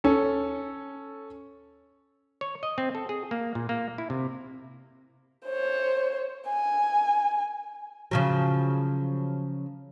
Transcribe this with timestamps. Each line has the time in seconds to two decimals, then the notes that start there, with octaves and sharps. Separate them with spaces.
0.04 C#4 A4
2.41 C#5
2.63 D#5
2.78 C4
2.95 A4
3.09 G#4
3.31 A#3
3.55 A#2
3.69 A#3
3.98 E4
4.10 C3
5.47 C5 C#5
6.49 G#5
8.11 C#3 F3 F#3